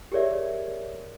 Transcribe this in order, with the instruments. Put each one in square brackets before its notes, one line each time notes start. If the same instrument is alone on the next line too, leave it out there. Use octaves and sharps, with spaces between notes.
[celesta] G4 G#4 A#4 C#5 D5 E5